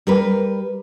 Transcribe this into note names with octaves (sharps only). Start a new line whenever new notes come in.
G3 A#4 B4